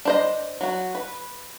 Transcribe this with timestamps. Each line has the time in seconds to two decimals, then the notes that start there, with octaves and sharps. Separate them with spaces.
0.05 D4 C5 D#5
0.61 F#3 F#4
0.95 B4